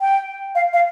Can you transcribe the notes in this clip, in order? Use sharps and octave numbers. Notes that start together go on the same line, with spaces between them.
G5
F5
F5